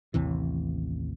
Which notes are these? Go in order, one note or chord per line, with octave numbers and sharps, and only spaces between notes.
A1 D#2 C3 E3